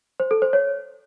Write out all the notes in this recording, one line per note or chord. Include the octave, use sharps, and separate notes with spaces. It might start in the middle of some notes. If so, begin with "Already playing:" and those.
C5
A4
C5
C#5